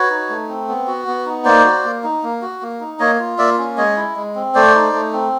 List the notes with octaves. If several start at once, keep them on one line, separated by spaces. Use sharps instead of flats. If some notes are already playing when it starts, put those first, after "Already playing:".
Already playing: F#4 B4 C#5
D#4
A3
C4
B3
F#4
B3
D#4
A#3 C5 D5
F#4
A#3
D#4
A#3
F#4
A#3
D#4
A#3 C#5 D#5
F4
A#3 D5 E5
C#4
G#3 C#5 D#5
E4
G#3
C4
A3 C5 D5
D#4
A3
C4